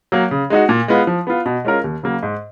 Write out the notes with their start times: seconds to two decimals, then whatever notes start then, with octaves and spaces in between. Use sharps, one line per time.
0.12 F#3 A#3
0.31 C#3
0.50 G#3 D#4 F#4
0.69 A#2
0.88 G#3 B3 F4
1.07 F3
1.27 B3 F4
1.46 B2
1.65 G#3 C#4 F4 A#4
1.84 D#2
2.03 C#3 F#3 A#3
2.23 G#2